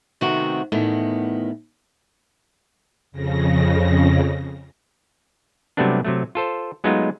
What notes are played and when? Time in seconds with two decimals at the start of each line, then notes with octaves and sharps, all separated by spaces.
0.21 C3 D#3 A3 B3 C4 F#4
0.72 E2 A2 D#3 B3
3.12 F2 C#3 A#6
5.77 C3 F#3 G3 A3 B3 D4
6.05 C3 F#3 A3
6.35 F4 A4 C5
6.84 F#3 G#3 A3 B3 D#4 F4